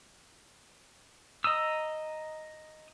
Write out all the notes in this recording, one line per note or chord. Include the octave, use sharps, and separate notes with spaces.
D#5 A#5 D#6 E6